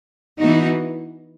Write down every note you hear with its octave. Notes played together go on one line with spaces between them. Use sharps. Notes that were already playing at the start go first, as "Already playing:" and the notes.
E3 B3 D#4 F#4